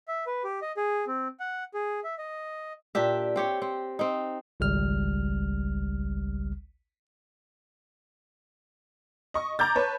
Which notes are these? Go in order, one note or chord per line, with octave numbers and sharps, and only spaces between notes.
E5
B4
G4
D#5
G#4
C4
F#5
G#4
E5
D#5
A#2 D4 G4 E5
C4 G4 C#5
C4
C4 D#4
G#1 C#2 G3 F6
D#5 C#6
A#5 D6 G6 A6
B4 C#5 A5